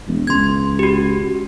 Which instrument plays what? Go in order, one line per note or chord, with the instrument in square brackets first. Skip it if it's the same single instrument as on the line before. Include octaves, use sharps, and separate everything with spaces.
[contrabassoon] E1
[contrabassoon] C#2 [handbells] C6 G#6
[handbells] F#4 G4